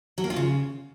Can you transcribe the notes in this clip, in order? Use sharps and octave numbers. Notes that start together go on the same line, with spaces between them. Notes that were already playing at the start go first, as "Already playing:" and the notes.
F#3
A#3
F4
C#3